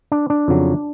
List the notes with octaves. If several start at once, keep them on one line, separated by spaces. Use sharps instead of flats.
D4
D4
F2 C#3 F#3